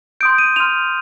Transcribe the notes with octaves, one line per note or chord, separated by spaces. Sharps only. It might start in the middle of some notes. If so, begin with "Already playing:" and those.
C6 D#6 G6 D7
D#7
C6 F6 F7